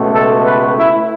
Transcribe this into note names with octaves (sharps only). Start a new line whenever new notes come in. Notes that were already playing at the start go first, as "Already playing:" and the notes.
Already playing: C#2 B2 A3
A4
B4
E4